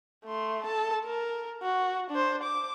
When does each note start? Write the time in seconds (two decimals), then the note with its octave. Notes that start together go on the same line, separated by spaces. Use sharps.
0.25 A3 C6
0.64 A4 A5
1.06 A#4
1.62 F#4
2.11 D4 C5
2.43 D6